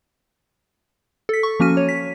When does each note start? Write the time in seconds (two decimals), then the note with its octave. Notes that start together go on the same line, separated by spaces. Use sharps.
1.29 A4 B6
1.43 C#6
1.60 F3 A#3 C#4 F#4 F6 D#7
1.77 C#5
1.89 B6